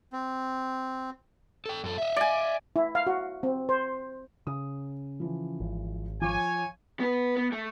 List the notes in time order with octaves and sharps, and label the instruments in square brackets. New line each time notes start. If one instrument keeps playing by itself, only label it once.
[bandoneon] C4
[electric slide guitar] A4 G5
F#2 A4
D#5 E5
[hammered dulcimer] D5 G#5
[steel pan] E4
F5
F#4
C4
C5
[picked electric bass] C#3 [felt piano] D#6
[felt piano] E3 F3
[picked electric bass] G#1
[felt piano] F3 F5 D6 [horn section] C#5 G#5
[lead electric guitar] B3 B4
B3
A3